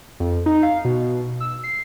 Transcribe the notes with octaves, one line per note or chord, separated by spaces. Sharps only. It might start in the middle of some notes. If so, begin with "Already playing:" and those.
F2
D#4
F5
B2
E6
C7